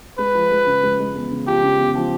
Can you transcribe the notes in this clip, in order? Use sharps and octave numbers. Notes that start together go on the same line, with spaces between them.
G#3 B4
F3
G#3
C#3
G#3
G#3
E2
C#3
F3 G4
C#3
E2
F3